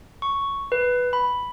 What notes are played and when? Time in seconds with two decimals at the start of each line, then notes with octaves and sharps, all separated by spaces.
0.22 C#6
0.72 B4
1.13 B5